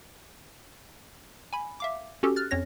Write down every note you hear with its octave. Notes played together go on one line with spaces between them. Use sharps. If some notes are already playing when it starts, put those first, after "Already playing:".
G#5 B5
E5 F5 D6
C#4 F#4 G4 A4
F6 F#6 A6
F2 C#4 C#5 A#6